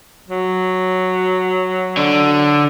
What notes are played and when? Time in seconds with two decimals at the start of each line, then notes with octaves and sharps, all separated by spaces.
0.28 F#3
1.97 D3